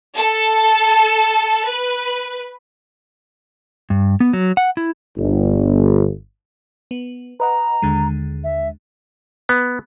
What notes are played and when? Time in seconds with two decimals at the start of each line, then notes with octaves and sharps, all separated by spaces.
0.15 A4
1.66 B4
3.90 G2
4.20 B3
4.33 F#3
4.57 F#5
4.77 E4
5.18 G1
6.91 B3
7.40 B4 D#5 F#5 A#5
7.82 D#2 D3 G#3
8.44 E5
9.49 B3